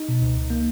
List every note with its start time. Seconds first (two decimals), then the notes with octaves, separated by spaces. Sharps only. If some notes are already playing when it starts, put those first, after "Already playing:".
Already playing: D#4
0.09 B2
0.22 C#2
0.37 C#2
0.50 A#3